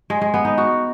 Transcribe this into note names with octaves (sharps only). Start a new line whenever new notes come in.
G#3
G#3
B3
D#4
F#4